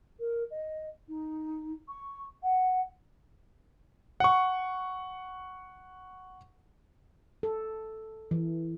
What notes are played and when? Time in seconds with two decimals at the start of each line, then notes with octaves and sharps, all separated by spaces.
0.19 A#4
0.50 D#5
1.08 D#4
1.88 C#6
2.42 F#5
4.20 F#5 C#6
7.43 A4
8.31 E3